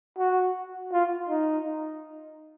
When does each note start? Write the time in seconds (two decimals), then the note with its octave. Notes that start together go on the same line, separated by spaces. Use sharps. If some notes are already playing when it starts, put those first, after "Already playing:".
0.18 F#4
0.93 F4
1.29 D#4